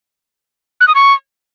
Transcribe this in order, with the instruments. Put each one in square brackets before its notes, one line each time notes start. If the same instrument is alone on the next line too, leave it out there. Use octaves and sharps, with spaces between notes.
[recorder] F#6
D#6
C#6